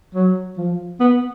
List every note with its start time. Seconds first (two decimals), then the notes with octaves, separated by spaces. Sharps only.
0.15 F#3
0.58 F3
1.00 B3